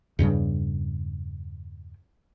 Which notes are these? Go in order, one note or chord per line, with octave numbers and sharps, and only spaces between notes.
E2 G2 C#3 G3